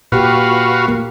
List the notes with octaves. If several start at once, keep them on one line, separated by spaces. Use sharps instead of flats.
A#2 F#4 G4 B4 F5
A#3